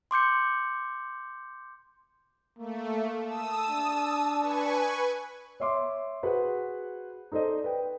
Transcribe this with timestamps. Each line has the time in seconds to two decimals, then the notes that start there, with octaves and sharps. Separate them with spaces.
0.11 C6 D6 G6 C#7
2.59 A3 A#3
3.27 A5 D#6 E6
3.69 D4
4.40 B4 G#5 C#6
5.60 C#5 E5 C6 D6
6.23 F#4 G#4 B4 C5 F#5
7.32 D#4 A4 C5 D5 D#5
7.64 B4 G5